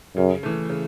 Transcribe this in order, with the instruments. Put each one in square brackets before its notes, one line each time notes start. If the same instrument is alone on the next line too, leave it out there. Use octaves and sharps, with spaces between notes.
[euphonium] F#2 [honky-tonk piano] C#3
[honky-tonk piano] E3 A3
C#3